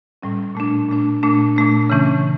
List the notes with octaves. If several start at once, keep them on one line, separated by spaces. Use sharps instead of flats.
A2 G3 C#4
A#2 A3 D4
A#2 A3 D4
A#2 A3 D4
A#2 A3 D4
C#3 E3 A3 C#4